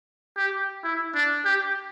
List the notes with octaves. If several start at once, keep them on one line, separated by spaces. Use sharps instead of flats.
G4
E4
D4
G4